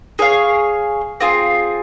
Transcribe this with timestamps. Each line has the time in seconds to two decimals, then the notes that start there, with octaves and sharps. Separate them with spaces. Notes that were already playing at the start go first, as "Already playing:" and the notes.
0.19 G#4 C#5 F5
1.20 C4 F4 G#4